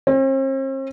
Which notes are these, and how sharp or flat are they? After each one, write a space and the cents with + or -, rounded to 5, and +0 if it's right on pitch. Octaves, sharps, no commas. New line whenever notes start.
C4 +45